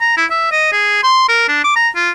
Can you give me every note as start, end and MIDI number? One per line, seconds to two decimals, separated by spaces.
0.01 0.13 82
0.17 0.25 64
0.31 0.51 76
0.52 0.71 75
0.72 1.01 68
1.03 1.24 84
1.29 1.46 70
1.48 1.61 62
1.64 1.74 86
1.76 1.89 82
1.95 2.10 65